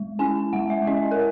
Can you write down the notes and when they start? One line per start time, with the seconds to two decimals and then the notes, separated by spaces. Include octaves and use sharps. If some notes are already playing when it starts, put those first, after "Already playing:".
Already playing: G#3
0.19 C#4 E4 G#5
0.53 G#3 F#5
0.70 E5
0.87 C#4 E4 D#5
1.11 A#4